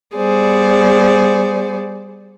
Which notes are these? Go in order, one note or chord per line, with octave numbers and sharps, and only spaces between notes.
G3 B3 G#4 C5 D5